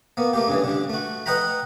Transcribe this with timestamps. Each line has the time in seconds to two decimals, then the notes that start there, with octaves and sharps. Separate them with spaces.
0.17 A#3 B3
0.33 A3 A#3 G4
0.48 G2 C#3 E3
0.64 D3 G3
0.89 A3 F#4
1.26 B4 D#5 F#5 G5 A#5 B5